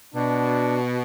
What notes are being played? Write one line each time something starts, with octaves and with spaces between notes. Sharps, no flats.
B2 D4